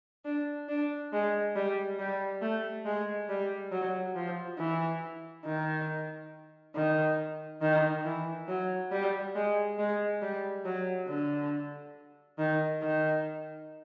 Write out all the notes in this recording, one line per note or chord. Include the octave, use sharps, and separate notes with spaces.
D4
D4
G#3
G3
G3
A3
G#3
G3
F#3
F3
E3
D#3
D#3
D#3
E3
F#3
G3
G#3
G#3
G3
F#3
D3
D#3
D#3